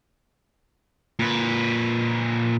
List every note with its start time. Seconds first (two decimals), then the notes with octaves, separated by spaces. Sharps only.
1.19 A#2 B4